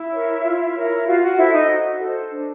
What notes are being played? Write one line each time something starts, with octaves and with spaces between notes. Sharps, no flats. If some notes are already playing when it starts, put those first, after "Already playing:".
Already playing: E4 E5
A#4 C#5
F4
A#4 C#5
F4 F#4 F5
F#4 F#5
E4 A4 C5 E5
D#4 D#5
F#4
A4 C5
D4